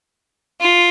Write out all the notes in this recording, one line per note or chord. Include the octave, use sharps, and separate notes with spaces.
F4